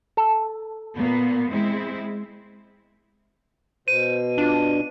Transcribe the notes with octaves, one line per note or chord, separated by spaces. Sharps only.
A4
A#2 A#3 B3
G#3 C4 E4
B2 C5 D#7
D4 F4